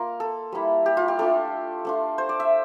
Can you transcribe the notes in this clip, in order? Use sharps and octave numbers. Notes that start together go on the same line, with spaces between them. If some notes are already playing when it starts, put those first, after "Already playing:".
Already playing: A#3 F4 A#4
A4
G3 A#3 E4
G4
F4
G4
A3 D4 F4 A4
A3 D4 F4
C5
D5
E5